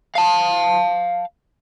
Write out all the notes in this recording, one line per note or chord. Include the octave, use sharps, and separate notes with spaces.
F5 A5